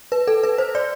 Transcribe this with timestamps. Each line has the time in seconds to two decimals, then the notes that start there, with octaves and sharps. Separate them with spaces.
0.12 B4
0.28 A4
0.44 B4
0.58 C5
0.75 D5